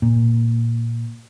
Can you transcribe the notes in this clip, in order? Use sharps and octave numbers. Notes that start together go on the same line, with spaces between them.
A#2